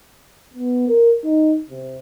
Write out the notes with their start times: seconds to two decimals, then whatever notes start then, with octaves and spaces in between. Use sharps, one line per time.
0.54 B3
0.88 A#4
1.24 D#4
1.70 C3